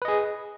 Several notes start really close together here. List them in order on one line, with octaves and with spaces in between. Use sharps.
B4 D#5 G#4